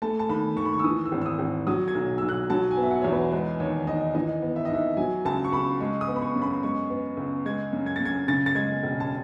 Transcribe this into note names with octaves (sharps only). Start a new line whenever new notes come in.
A3 A5
A5
D#2 B5
D#2 C#6
B5
C#6
E6
E3 D#6
E6
G#1
E6
D#6
G#1
F#3 D#6
G#6
B1
B1 E6
F#6
F#3 A5
G#5
B3
E5
F#5
E2 C#5
B4
G#3 B4
D#2 C#5
D#2 D#5
E3 D#5
B3
E5
D#5
D#2 E5
F#3 G#5
C#2 A5
C#6
C#2 B5
G#3 C#6
D#6
B3
B5
C#6
F#2
B5
G#3 C#6
B3
C#2
G#3 G#6
F#2
G#6
A6
F#2
G#6
C#3 A6
A6
G#3 G#6
E1
A5